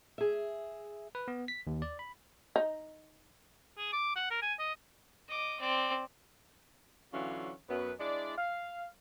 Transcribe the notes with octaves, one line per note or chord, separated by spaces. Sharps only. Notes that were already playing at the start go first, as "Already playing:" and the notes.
G#4 E5
B4
B3
B6
D#2
D5
B5
D#4
G#4
D6
F#5
A#4
G#5
D#5
D#5 D6
C4 D5
D3 E3 F#3 C#4 F4 F5
F#2 B3 B4
G#3 D4 E4 D5
F5